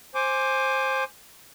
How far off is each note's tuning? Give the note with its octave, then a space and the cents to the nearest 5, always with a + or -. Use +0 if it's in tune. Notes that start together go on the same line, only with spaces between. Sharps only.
C5 +15 G#5 +0 D6 +0